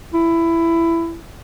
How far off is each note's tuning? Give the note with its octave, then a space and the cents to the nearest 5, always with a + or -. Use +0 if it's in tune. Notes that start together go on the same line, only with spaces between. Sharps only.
E4 +15